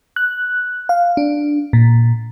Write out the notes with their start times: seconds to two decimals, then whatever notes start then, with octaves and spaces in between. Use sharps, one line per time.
0.16 F#6
0.89 F5
1.17 D4
1.73 A#2